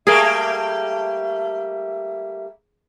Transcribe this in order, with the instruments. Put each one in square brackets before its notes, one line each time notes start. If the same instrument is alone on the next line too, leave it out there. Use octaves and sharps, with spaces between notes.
[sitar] G3 A3 A#3 [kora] G#4 A#4 [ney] E5